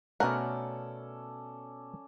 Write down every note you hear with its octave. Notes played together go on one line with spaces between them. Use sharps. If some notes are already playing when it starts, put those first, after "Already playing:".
B2 A3 C#4 A4 A#4 D5 F#5